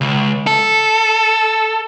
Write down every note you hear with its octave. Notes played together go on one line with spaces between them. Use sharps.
C#2
A4